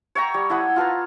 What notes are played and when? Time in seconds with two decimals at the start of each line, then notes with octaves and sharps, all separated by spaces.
0.15 C#5 E5 G5 A#5
0.34 G3
0.50 E4 A4 F#5 D#6
0.76 F4 A4 B4 A#5